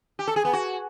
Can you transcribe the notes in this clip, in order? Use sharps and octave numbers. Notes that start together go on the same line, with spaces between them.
G4
A4
G#4
B3
F#4